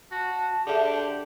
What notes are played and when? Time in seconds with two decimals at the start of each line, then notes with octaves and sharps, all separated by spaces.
0.11 F#4 A5
0.67 D3 G4 G#4 D5 E5